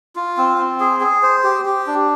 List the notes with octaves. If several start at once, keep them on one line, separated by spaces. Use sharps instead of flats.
F4
C4
C4
G#4
G#4
C5
G4
G4
D4